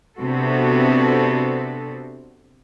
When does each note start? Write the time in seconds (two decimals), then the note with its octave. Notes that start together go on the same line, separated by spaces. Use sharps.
0.18 C3 B3 C4 D4 F#4 A4